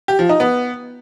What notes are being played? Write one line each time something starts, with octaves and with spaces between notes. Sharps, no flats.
G4
F3
D#4
B3